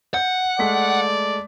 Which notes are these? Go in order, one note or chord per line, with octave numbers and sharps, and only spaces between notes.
F#5 G6
G#3 A3 D5 B6